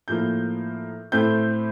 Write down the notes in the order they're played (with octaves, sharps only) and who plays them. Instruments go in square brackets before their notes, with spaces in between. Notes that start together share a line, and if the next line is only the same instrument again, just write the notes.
[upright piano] A2 F3 A#3 G6
A2 A3 C4 G6